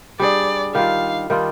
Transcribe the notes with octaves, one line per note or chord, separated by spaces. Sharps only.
G3 D4 G#4 D5
D#3 G3 D4 F4 F5
D#3 G3 D4 F4